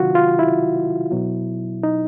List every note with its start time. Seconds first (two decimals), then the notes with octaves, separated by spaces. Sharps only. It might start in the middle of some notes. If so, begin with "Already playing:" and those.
Already playing: C3 D#3 F#3 F4 F#4
0.15 F4
0.39 E4
1.12 B2 F#3
1.83 D#4